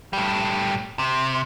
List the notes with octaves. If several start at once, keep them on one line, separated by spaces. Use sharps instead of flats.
A2 G3
C3